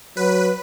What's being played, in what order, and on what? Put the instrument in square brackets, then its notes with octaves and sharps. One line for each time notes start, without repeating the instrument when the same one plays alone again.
[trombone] F#3 [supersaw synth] B4